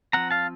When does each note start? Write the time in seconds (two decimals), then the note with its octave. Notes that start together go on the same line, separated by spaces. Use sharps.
0.13 F3 C4 F#5 A#5
0.31 F5 A5